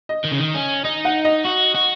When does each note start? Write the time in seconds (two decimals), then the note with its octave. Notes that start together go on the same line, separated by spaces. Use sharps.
0.09 D#5
0.24 D#3
0.31 C#3
0.38 D#3
0.54 C#4
0.84 D#4 D#5
1.05 F#5
1.25 D#5
1.45 F#4
1.75 F#4